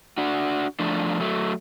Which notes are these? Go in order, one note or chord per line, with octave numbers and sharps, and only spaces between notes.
D4 F#4
F3 A3 D4
F#3 A3